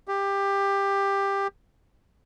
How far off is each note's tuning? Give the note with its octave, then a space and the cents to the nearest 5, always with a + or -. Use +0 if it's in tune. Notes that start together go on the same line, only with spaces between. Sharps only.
G4 +15